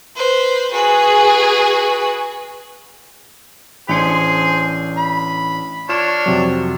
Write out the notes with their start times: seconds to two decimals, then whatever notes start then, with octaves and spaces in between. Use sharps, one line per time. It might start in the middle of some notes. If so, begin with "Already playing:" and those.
0.16 B4 C5
0.73 F#4 G#4 B4
3.89 A1 D4 G#4 C5 C#7
4.97 B5
5.89 D4 F4 C#5 F6 E7
6.26 F2 C3 F#3